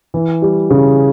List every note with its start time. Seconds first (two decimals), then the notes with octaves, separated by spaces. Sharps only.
0.14 E3
0.42 G3
0.71 C#3